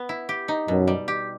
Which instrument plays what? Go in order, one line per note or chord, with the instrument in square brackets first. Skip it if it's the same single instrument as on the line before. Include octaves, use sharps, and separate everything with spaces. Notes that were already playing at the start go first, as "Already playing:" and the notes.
Already playing: [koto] B3
E4
G4
D#4
[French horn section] F#2 [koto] B2
[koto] G3
G4